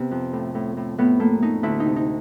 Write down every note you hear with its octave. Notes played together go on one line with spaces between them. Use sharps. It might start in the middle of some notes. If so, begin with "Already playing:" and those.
Already playing: C3 B3
F2
A2
A2
A2
A2 B3
A3 A#3
A3 D#4
D2 E4
D#4
C3
D#4